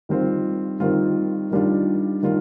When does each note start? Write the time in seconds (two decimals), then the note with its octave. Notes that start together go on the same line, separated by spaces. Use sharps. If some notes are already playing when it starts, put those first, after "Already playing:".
0.09 D#3 G3 C4 F4
0.80 D#3 G3 C4 F4
1.51 D#3 G3 D4 F4
2.23 D#3 G3 D4 F4